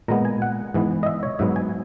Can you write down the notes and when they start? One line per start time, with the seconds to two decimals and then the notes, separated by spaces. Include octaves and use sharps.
0.08 A#2 G#3 B3 A#5
0.25 G#5
0.42 F#5
0.74 G#2 E3 B3
1.03 D#5
1.06 E5
1.23 C#5
1.39 G#2 F#3 B3 E5
1.56 G#5